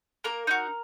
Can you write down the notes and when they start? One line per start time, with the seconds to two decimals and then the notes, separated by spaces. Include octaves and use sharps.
0.24 A#3 A#4
0.47 D#4 F#4